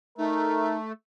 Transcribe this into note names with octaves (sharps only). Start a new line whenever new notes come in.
A3 D#4 A#4